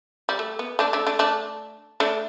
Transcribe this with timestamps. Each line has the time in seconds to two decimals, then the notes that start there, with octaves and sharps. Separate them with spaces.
0.29 G3
0.39 A3
0.59 B3
0.79 A3 D4
0.93 A3 D4
1.06 A3 D4
1.19 A3 D4
2.00 A3 D4